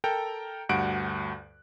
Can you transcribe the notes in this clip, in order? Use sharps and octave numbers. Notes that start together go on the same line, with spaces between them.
A4 A#4 G5 A#5 G6
D2 G2 F#4 F#5 F#6 D7